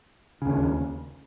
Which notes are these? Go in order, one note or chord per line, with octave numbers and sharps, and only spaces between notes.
D#2 C#3